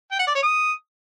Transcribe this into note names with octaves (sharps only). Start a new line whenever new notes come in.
G5
F#5
D5
C#5
D#6